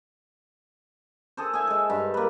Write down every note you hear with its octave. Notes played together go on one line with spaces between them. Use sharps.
G#4 A4 C5
G#4 E5 G#5
G#3 A4
G2
A#3 B4